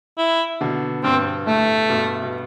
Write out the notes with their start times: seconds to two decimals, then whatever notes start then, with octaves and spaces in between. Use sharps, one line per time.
0.18 E4
0.61 B2 D3
1.03 G2 C4
1.46 A2 A3
1.89 G2 B2
2.22 B2